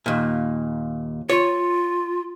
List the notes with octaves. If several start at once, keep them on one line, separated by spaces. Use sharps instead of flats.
D#2 A#2
F4 C#5